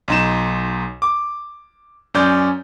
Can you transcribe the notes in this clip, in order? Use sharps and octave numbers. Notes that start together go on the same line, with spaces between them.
B1 D#4 E7
D6
F#2 C#4 D5 G6